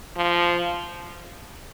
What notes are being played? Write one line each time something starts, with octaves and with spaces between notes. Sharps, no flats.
F3